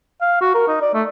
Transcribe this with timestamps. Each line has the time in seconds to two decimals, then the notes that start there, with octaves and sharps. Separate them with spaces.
0.21 F5
0.41 F#4
0.55 A#4
0.68 D#4
0.82 D5
0.94 A3